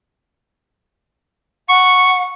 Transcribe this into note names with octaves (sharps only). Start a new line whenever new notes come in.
F#5 C#6